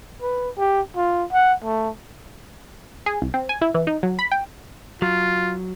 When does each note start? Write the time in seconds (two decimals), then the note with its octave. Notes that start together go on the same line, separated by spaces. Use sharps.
0.22 B4
0.58 G4
0.96 F4
1.32 F#5
1.64 A3
3.06 G#4
3.22 C2
3.34 C4
3.49 G#5
3.61 E4
3.74 E3
3.87 D#4
4.03 F#3
4.19 B5
4.32 G5
5.02 F#3 F4